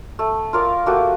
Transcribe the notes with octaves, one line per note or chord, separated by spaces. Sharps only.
A3
F4 A#4 D5
A3 A#3 F#4 G4